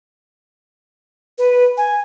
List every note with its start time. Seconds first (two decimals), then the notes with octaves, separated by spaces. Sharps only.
1.38 B4
1.77 G#5